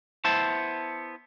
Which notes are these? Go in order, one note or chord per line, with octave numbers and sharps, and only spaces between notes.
B3 E4 C5 A5